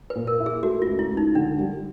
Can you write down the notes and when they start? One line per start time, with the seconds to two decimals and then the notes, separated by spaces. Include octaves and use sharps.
0.10 B4
0.15 A#2
0.27 A#4
0.40 E4
0.46 G#4
0.63 A3 F#4
0.82 F4
0.87 C#2
0.99 E4
1.12 C#2
1.17 D#4
1.35 D3 D4
1.59 G3